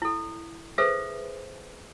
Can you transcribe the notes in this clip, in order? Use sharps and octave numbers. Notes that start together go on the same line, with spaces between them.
E4 A4
G#4 A4 B4 C5 E5